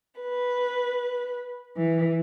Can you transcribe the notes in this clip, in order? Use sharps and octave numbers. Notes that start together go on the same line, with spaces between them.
B4
E3